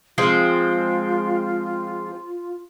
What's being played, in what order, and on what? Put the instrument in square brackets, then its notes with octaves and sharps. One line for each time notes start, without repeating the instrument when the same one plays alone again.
[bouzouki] F3 G#3 C4 [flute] F4